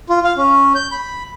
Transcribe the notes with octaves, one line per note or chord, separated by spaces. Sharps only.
F4
F5
C#4
G6
B5